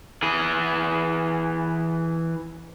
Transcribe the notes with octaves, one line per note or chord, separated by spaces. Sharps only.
E3 G#4